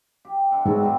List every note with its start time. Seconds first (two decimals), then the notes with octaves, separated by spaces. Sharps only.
0.25 G4
0.51 D3 E5 F#5
0.66 G#2 B2 F#3 G#3 C4
0.80 D#3 G3 C4